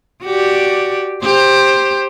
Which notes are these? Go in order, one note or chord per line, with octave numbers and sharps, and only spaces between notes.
F#4 G4 D5
G4 C5